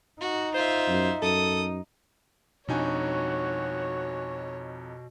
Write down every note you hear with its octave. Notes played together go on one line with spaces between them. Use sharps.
D#4 F#4
F4 C5 E5
F#2
F#2 A4 D#6
F2 B2 D4 D#4 F#4 C#5 G#5